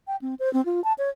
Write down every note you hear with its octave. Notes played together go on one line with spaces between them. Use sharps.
G5
C4
C5
C4
F4
A5
C#5